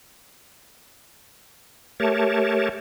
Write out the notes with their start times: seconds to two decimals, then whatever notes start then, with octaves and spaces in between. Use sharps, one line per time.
2.00 A3 G4 A#4 C#5 A5